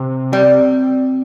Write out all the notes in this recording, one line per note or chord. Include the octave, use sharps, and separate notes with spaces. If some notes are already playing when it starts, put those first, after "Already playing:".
Already playing: C3
G3 C4